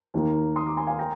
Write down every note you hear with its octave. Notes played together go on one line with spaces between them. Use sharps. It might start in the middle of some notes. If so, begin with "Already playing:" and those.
D#2 D#3 A#3
C6 D#6
A#5 D6
G#5 C6
F5 G#5
G5 A#5